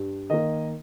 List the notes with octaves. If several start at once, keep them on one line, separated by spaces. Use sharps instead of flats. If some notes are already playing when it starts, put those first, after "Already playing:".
Already playing: G2
D#3 A#3 D#5